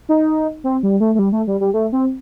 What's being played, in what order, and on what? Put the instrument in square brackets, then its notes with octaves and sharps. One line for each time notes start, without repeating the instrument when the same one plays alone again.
[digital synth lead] D#4
C4
G3
A3
A3
G3
A3
G3
G3
A3
C4